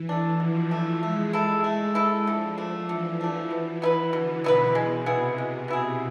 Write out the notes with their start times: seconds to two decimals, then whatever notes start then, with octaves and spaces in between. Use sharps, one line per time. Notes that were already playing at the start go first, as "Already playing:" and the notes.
Already playing: E3
0.09 A3 D4
0.40 B2 F3
0.71 F3 A3 D4
1.02 G#3 A3
1.33 E4 A4
1.64 A3
1.95 E4 A4
2.27 D3 F3
2.58 A3 D4
2.88 D3 E3
3.21 A3 D4
3.51 B2
3.82 B3 E4 B4
4.13 B2 D3
4.44 B2 B3 E4 B4
4.75 B2 G#3
5.06 C3 B3 E4 G#4
5.38 G#3
5.68 B3 E4 G#4